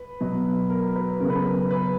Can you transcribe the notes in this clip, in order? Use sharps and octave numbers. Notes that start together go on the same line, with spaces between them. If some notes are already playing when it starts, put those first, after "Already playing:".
Already playing: B4
B2 F#3 B3
A#4
B4
C#3 F#3 B3 A#4
B4
A#4
B4